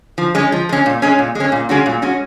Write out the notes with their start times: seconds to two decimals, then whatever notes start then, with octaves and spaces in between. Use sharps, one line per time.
0.18 F3
0.35 G#3 C#4
0.52 F3
0.69 G#3 C#4
0.86 A#2
1.02 G#3 C#4
1.19 A#2
1.35 G#3 C#4
1.52 A#2
1.69 G#3 C#4 F#4
1.86 A#2
2.02 G#3 C#4 F#4